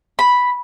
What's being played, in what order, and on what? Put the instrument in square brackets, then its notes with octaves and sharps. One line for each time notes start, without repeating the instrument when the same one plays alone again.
[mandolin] B5